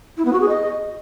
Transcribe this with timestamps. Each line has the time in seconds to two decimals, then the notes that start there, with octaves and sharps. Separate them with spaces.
0.17 E4
0.25 B3
0.33 F#4
0.41 G#4
0.49 D#5